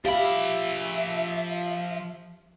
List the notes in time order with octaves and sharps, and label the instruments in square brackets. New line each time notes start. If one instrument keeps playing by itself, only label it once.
[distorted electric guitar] F3 B5 [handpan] G4 F5 [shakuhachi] E5